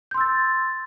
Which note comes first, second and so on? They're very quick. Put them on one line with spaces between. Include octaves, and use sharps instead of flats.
G6 C6 E6 A6